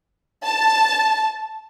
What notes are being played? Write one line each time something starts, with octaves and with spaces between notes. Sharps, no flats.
A5